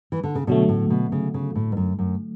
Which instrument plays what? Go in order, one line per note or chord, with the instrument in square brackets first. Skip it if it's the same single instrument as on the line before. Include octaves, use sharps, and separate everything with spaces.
[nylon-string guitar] E3
D3
C#3
[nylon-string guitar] B2 [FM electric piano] D3 F#3 A3
[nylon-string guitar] A2
B2
C#3
C#3
A2
G#2
F#2
F#2